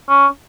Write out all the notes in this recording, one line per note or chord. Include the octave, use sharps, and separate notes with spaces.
C#4